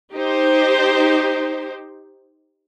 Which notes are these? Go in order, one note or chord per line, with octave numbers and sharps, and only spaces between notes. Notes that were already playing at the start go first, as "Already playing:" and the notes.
D#4 G4 C5